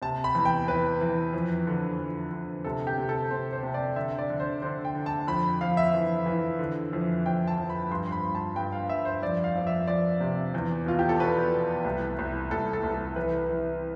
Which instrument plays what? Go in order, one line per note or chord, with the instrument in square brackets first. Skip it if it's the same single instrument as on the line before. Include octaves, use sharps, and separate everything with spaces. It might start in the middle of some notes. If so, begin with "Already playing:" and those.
[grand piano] C3 A5
B5
E2
G5
E3 B4
E3
F2
D3
F2
D3
C3 A4
G4
C3
A4
C3 C5
C5
C3
D5
D3 E5
D5
D3
C5
D3 C5
G5
D3
A5
F2 B5
F2 F5
E5
E3
E3
D3
F2
F2 G5
A5
F2
B5
G2 C6
B5
G2
A5
G2 G5
F5
G2 E5
C5
F2 D5
F5
F2
E5
F2 D5
C3
E2
B2 F4
G4
A4
B2 B4
B2
C2
C2
C2 A4
A4
C2
A4
E3 B4
E3